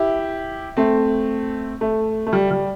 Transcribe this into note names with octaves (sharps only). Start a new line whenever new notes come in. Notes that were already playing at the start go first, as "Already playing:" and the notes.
Already playing: E4 G4
A3 C4
A3
A3
G3
G3